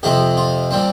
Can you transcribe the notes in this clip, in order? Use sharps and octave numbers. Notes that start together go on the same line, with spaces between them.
F2 C3 F3 C4 G4
F4
A#2 G3 C4